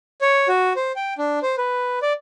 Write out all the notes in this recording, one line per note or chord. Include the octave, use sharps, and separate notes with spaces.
C#5
F#4
C5
G5
D4
C5
B4
D5